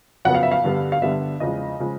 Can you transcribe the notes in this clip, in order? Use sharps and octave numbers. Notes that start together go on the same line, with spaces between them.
F2 C#3 F#3 B3 F#5
F5
E5
F5
G2 D3 G3 B3
F5
G2 D3 G3 B3 E5
E2 C#3 F3 G#3 D#5
C#3 F3 G#3